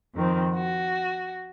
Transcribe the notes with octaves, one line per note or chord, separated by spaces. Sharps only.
F2 D#3 C4
F#4